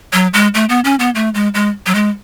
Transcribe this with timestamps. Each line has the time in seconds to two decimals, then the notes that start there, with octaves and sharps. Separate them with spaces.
0.13 F#3
0.34 G#3
0.54 A3
0.69 B3
0.84 C#4
0.99 B3
1.15 A3
1.34 G#3
1.54 G#3
1.86 F#3
1.95 G#3